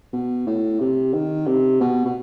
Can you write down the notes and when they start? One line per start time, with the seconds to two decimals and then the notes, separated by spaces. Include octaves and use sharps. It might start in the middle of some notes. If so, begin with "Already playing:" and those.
0.13 B2
0.47 A2
0.80 C3
1.13 D#3
1.47 C3
1.80 B2
2.05 B2